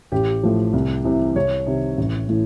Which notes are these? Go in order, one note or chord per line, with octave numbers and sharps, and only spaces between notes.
A1 G4
A2 F3
C2
C3 E3
C2 C#5
C3 D#3
A1
A2 E3